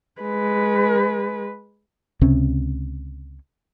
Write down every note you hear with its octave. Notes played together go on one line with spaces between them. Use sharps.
G#3 B4
C#2 C3 C#4